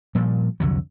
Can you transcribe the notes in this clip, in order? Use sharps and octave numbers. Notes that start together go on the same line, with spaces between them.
A#2 F3 G3
C2 F2 D3 F#3